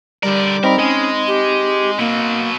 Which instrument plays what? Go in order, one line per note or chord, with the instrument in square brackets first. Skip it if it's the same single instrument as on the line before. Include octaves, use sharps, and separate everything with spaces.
[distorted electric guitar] D3 A#4 [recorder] G3 [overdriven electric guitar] D5
[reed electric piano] C4 D#4 B5 [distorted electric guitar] A#4
[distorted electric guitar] G#3 [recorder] C#4 [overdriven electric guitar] D#5
[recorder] G4
[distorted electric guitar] B2 F#3 [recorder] A#3